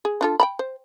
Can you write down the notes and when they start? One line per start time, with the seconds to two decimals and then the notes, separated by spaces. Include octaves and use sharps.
0.05 G#4
0.21 D4 F4 A4
0.40 G5 A#5 B5
0.59 C5